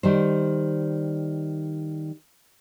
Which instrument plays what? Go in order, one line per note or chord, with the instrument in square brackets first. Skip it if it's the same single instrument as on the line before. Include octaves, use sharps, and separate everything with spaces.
[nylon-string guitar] D#3 G3 C5